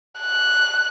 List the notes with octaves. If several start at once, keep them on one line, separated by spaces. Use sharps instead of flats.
F#6